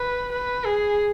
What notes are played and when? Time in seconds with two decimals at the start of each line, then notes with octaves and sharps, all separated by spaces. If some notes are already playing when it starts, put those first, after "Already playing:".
Already playing: B4
0.32 B4
0.64 G#4